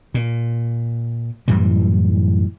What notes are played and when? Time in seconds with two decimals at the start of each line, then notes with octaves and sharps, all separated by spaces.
0.14 A#2
1.48 F#2 A2 E3 G3